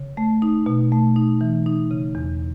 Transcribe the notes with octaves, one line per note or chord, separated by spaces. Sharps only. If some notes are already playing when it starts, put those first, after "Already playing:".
Already playing: C#3
A3
D#4
B2
A3
D#4
E3
D#4
C#3
E2